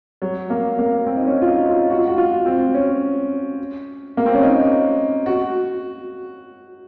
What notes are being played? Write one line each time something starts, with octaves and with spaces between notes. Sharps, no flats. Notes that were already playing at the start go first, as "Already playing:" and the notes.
F#3
A#3
A#3
C4
D#4
C#4
F4
D#4
F4
F#4
F4
F#4
F4
C4
C#4
A#3
C4
C#4
D#4
F#4